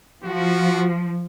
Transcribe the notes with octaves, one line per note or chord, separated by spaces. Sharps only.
F3 F4 F#4